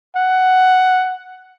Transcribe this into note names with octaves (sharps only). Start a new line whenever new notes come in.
F#5